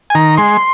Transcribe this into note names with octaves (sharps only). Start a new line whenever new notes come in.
G#5
D#3 A#5
G#3 C6